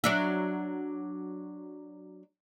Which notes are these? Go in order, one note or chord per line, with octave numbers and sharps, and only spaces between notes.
F#3 D4 E5